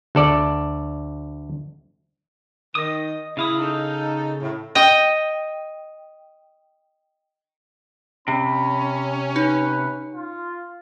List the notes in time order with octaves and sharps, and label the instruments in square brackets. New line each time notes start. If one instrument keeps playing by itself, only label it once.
[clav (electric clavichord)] D2 A4 D5
[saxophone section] D#3 [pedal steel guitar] D#5 D#6
[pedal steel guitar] C#3 F5 D#6 [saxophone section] E4
[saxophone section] D#4 A4
A2
[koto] D#5 G5
[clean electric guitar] C3 [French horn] C#4 [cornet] B5
[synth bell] D#4 [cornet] B4
[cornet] F4